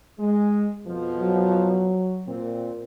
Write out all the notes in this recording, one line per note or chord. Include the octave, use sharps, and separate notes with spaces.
G#3
F2 B2 F3
F#3
A#2 C4